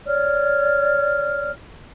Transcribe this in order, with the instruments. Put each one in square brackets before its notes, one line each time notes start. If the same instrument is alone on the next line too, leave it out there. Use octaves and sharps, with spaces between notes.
[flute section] C#5 D5 F6